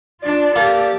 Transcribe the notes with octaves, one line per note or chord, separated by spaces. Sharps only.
D4 F4 D5
A#3 G4 A4